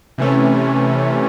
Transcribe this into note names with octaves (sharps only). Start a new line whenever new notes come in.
C3 E3 A3 C#4